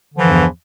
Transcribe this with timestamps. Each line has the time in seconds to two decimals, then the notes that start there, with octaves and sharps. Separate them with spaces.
0.14 D3
0.17 F3
0.20 E3
0.23 G2
0.27 E2